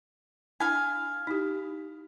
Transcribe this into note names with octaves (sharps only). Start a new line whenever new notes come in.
D4 E4 F5 G#5
D#4 E4 G4